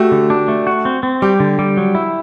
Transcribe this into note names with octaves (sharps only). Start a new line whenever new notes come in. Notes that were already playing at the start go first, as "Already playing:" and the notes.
Already playing: A3 F#4 G4
D3
D4
A3
F#4
C4
C4
G3 G4
D3
G3
F#3
E4